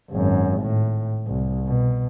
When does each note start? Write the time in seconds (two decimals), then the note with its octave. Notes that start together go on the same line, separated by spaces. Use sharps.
0.11 G#1 F#2
0.61 A2
1.28 C2
1.67 B2